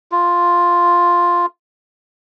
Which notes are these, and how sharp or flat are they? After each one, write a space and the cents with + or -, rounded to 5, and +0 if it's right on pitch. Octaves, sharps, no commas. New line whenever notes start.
F4 +0